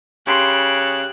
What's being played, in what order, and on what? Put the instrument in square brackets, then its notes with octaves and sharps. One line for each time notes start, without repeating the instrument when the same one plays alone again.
[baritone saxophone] C#3 [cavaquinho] G4 B5 C6 [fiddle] F#6